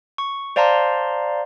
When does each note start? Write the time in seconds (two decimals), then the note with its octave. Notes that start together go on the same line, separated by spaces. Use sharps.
0.18 C#6
0.56 C5 D5 F5 A5 A#5 C6